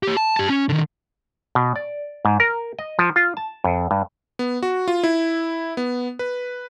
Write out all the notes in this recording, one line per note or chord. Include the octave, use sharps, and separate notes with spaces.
G4 C#5
A5
G4 A5
C#4
D3 D#3
B2
D5
G#2
A#4
D#5
F3
F4
A5
F2
G2
B3
F#4
F4
E4
B3
B4